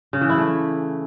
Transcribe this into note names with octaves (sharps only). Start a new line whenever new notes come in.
C#3
E3
E4
A3